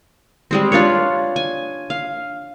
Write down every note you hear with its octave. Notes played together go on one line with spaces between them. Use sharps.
G3 G#3 C4
D4 F4 B4 C#5
G#5
F5